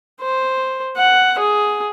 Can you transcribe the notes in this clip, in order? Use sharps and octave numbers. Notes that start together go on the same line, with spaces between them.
C5
F#5
G#4